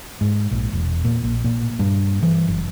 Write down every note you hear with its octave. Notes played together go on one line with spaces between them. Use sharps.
G#2
A#1
E1
A#2
A#1
A#2
G2
E3
F#1